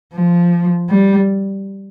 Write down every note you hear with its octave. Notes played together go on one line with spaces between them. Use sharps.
F3
G3